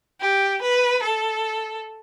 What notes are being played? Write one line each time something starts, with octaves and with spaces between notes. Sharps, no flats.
G4
B4
A4